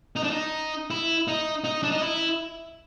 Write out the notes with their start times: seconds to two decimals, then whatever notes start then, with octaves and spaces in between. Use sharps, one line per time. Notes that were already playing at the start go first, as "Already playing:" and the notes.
0.16 D#4
0.23 D4
0.31 D#4
0.91 E4
1.28 D#4
1.64 D#4
1.83 D4
1.91 D#4
2.02 E4